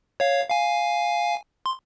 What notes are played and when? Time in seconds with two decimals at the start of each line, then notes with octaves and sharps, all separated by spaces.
0.20 C#5 F5
0.50 F5 G#5
1.66 C6